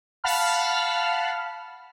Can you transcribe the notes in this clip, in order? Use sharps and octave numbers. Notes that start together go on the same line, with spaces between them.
F5 F#5 A5 B5 F6